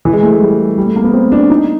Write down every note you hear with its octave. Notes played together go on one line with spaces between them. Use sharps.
E3
G#3
A3
G#3
G3
G3
A3
A#3
B3
C4
D4
D#4